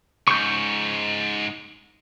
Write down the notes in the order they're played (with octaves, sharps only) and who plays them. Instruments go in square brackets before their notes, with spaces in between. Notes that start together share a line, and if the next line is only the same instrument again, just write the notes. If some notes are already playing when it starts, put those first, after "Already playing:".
[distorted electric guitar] G#2 C#3 [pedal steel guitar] C#6 G6